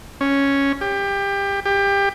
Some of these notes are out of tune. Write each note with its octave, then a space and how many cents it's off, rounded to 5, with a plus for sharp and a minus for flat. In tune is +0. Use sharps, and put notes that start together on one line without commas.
C#4 +0
G4 +25
G4 +25